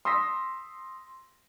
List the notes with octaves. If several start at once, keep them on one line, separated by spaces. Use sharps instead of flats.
C6 D#6 E6 A#6 B6